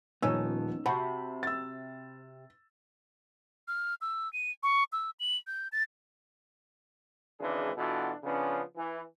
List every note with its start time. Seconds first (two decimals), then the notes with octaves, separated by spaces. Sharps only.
0.23 D#1 F3 B3 C#4 D#4 E6
0.86 C3 F#4 C5 A5 B5
1.43 E6 A6
3.68 F6
4.01 E6
4.33 D#7
4.63 C#6
4.92 E6
5.20 F#7
5.47 G6
5.72 A6
7.40 G#1 C#3 E3 G#3 D4 G#4
7.77 B2 E3 D4 F4 F#4 A4
8.23 C#3 F3 B3 C#4 D4 G#4
8.76 E3